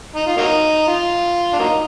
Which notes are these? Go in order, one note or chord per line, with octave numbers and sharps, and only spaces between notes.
D#4
F4
F#3 A#3 D#4
F4
D4
F#3 A#3 D#4